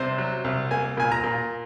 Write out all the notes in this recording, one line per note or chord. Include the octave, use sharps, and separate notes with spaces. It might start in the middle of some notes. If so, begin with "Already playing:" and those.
Already playing: C2 C3 C5
F#3
C2
A#3 G#5
A#2 G#5
A#5
A#2